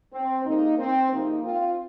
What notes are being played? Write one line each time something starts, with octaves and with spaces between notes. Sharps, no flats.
C4
C3 F3 G#3 A#3 D#4
C4
C3 F3 G#3 A#3 D#4
C4 F4